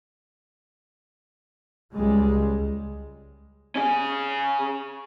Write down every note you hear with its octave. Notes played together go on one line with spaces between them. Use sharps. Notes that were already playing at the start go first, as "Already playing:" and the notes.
C#2 G3 G#3
C#4 G#4